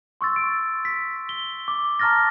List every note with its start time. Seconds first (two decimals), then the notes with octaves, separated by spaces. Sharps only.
0.21 C6 C#6 E6 A6
0.36 C#6 D7
0.85 B6
1.29 G7
1.68 D6
1.99 A5 A#5 C#6 F6 A6 A#6